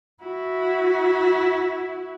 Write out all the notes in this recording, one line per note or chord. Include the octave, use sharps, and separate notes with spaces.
E4 F#4